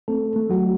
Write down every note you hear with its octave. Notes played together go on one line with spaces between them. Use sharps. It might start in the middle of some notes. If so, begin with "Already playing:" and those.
A3 C4 A4
A3
F#3 F#4